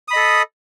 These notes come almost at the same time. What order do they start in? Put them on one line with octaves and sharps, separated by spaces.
D#6 B5 D#5 A4